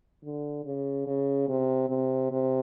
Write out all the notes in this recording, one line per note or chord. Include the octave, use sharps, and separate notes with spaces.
D3
C#3
C#3
C3
C3
C3